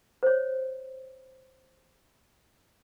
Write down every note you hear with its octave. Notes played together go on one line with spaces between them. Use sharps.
C5 C#5